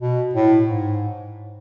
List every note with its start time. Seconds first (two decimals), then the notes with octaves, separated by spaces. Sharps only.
0.01 B2
0.34 A2
0.65 G#2